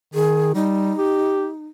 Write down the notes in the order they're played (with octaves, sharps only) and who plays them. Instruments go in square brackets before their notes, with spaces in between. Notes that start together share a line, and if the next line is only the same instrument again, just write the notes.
[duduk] D#3 [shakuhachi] G#4
[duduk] G3 [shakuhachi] D#4
[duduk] G4